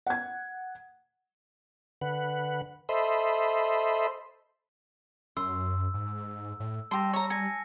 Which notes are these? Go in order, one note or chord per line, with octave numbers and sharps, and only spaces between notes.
F#5 G#6
D3 B4 F#5
A4 C5 D#5 E5 B5 C6
F#2 C6 E6
G#2
A2
G3 G4 A5 C6 E6 A#6
C#5 A#5
G#5 A#6 C#7